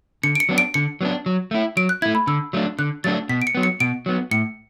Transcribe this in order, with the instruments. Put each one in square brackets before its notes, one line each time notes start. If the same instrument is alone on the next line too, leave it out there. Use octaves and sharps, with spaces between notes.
[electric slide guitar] D3 [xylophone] C#7
[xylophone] D7
C#7
[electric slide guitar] F#3 B3 D4
[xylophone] D7
[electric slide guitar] D3 [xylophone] C#7
[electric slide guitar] F#3 B3 D4
F#3
A3 E4
[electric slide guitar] F#3 [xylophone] D7
[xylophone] F#6
[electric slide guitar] A3 E4 [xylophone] G#6
[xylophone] B5
[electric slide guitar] D3 [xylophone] E6
[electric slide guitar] F#3 A3 D4
[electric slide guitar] D3 [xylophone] F#6
[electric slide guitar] F#3 A3 D4 [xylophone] A6
[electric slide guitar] B2 [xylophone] B6
[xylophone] D7
C#7
[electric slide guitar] F#3 B3
[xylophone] C#7
[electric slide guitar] B2 [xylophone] D7
[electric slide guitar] F#3 B3
[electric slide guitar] A2 [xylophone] C#7